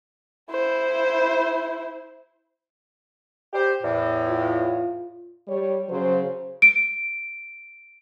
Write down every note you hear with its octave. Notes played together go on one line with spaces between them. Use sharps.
E4 C5
G4 C5
E2 A2
F4
G3 C#5
C#3 F#3 C5
D7